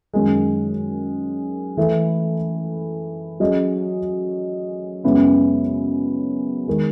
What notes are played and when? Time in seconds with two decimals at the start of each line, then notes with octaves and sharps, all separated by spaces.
0.14 F#2 D#3 G#3
1.77 E3 A3 E4 A4
3.40 F#3 C#4 G#4 D#5
5.04 F#2 C#3 G#3 B3 E4
6.68 D#3 G#3